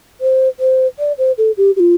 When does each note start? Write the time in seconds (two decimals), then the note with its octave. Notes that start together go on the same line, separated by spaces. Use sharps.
0.21 C5
0.60 C5
0.99 D5
1.18 C5
1.38 A4
1.57 G4
1.76 G4
1.80 F4